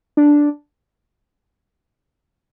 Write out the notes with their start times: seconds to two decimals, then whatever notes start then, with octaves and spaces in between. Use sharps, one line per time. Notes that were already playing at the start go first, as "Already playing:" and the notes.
0.17 D4